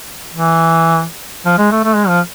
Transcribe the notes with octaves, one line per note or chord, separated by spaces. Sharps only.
E3
F3
G#3
A3
A3
G#3
F3